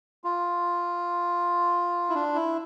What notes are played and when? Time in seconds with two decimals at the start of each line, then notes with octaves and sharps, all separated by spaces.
0.24 F4
2.09 E4
2.15 D4
2.35 E4